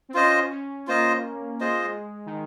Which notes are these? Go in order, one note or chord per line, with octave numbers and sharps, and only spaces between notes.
C4
C#4 F4 C5 D#5
C#4
A#3 F4 C5 D#5
G#3 F4 C5 D#5
D#3